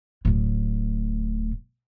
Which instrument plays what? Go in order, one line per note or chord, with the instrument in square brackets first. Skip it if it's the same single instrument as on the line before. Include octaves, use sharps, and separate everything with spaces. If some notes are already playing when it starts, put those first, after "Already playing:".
[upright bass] D1 A2